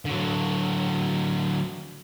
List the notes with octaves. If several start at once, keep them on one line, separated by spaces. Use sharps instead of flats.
D3 F#3